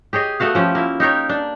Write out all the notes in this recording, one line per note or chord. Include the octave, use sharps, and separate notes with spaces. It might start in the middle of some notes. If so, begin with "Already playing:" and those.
G4 G#4 C#5 D#5
A3 B3 F#4 F5
F3 C#4 G4
A#3 E4
D#4 G4 A#4 C#5
D4